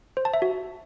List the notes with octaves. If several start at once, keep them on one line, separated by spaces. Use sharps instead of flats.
C5
A5
E5
F#4